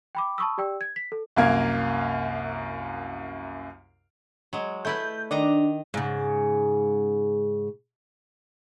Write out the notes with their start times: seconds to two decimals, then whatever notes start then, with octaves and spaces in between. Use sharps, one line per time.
0.15 G5 B5 D6
0.38 A5 B5 C#6 D#6 E6
0.58 G4 D5 G5 E6
0.81 G#6
0.96 B6
1.12 A4
1.36 C2 F#2 A#3 F5 G#6
4.53 F#3 G#3
4.85 A3 E4 B4 G6
5.31 D#3 D4 D#5 A#5
5.94 G#2 C#3